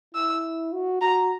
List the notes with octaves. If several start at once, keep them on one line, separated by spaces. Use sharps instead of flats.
E4 E6
F#4
F#4 A#5